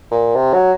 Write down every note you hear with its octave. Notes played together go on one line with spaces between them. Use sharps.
A#2
C3
F#3